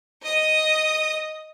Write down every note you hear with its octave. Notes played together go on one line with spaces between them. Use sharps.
D#5 D#6